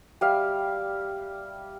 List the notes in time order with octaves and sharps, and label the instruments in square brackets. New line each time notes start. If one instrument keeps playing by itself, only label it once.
[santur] G3 G4 E5 F5